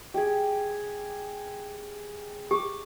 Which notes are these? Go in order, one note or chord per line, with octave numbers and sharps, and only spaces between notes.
G4 G#4
G4 D6